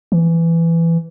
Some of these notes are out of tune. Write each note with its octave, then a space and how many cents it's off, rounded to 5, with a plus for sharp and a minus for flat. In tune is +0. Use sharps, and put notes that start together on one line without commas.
E3 +15